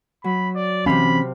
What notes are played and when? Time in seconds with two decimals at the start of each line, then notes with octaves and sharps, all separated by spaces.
0.24 F#3 B5
0.55 D5
0.86 C3 E3 C4 C#4 F5 B5